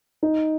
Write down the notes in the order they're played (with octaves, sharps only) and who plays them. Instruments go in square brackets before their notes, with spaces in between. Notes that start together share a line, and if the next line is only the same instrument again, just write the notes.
[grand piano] D#4